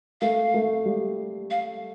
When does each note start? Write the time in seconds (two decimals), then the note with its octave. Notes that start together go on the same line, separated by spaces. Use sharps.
0.21 A3 F5
0.54 A3
0.86 G3
1.51 F5